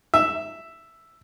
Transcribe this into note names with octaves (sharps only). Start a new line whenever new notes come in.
E5